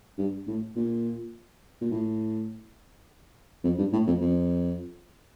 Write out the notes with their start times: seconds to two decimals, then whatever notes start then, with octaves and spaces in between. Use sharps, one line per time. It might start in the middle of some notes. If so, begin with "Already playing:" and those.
0.18 G2
0.47 A2
0.76 A#2
1.81 A#2
1.91 A2
3.64 F2
3.78 G2
3.93 A2
4.07 F2
4.21 F2